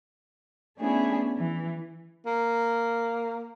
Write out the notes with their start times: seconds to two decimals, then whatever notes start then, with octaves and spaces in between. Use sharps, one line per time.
0.77 A3 B3 C#4 D4 E4 G#4
1.36 E3
2.26 A#3